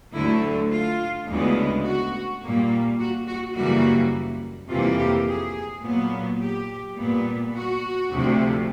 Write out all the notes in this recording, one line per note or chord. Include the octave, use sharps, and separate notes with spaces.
D2 D3 F#3 A3 E4
F4
D2 C#3 E3 G#3 B3
F#4
A#2 G3 A#3
F#4
F#4
F#2 C#3 E3 G3 A#3 F#4
F2 C3 E3 G3 A#3 F4
G4
G#4
A#2 F#3 B3
G4
A#2 G3 B3
F#4
D2 C3 F3 A3